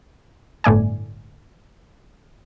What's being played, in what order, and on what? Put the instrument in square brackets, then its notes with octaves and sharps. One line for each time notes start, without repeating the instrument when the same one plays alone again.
[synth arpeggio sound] G1 A2 A3 D5 G#5